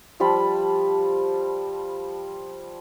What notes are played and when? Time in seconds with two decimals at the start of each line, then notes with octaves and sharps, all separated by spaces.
0.20 F3 G3 A5 B5